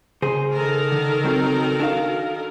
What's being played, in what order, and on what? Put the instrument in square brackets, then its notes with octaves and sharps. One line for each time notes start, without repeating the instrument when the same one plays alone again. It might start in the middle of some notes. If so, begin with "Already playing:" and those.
[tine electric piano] C#3 [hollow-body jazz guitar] G#4 C5
[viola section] D#3 A4 A#4
[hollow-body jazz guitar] D3
F#3 C4 F#4
D4 F#4 F5